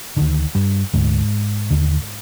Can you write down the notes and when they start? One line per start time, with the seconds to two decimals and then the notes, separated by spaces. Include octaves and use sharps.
0.17 D2 D3 D#3
0.55 G2 G3
0.93 D2 G#2 D3 G#3
1.71 D#2 D3